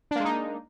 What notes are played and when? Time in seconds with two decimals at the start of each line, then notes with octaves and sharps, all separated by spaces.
0.11 D4
0.16 A#3
0.20 G#3
0.25 D#4